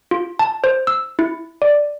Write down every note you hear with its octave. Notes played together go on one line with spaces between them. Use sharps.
F4
A5
C5
E6
E4
D5